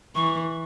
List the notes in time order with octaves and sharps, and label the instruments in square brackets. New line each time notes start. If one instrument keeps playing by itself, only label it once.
[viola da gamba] E3 [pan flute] C#6